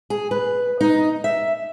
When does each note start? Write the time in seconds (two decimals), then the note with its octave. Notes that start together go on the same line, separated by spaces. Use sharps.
0.10 G#4
0.31 B4
0.81 D#4
1.24 E5